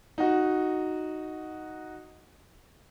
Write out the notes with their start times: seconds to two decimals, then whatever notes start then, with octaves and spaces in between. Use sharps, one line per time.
0.18 D#4 F#4